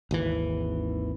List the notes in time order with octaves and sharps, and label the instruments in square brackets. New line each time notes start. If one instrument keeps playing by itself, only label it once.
[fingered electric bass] G#1 D#2 E3